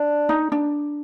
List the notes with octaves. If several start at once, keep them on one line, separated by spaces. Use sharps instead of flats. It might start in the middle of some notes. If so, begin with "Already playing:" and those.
Already playing: D4
D#4
D4